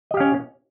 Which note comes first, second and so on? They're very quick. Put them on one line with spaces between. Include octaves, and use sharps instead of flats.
D#5 G4 F5 C#4